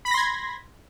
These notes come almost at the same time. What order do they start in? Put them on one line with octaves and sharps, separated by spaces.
B5 B6 A#6 C6 G#6